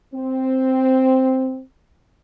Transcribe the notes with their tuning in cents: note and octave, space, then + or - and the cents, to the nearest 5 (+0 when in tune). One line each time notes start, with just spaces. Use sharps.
C4 +0